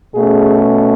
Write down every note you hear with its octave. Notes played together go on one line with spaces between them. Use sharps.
B2 A3 C#4 G#4